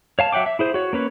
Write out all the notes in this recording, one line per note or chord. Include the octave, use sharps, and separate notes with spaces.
C#5 F5 A5
F#3 E5 F#5 G5 D6
E5
E4 G#4 C5
F#4 C#5
A#3 C#4 B4 C#5